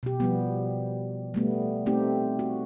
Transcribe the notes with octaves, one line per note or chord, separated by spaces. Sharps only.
B2 G4
F3 G3 B3
G3 A3 B3
A3 C4 D#4 G4
F#4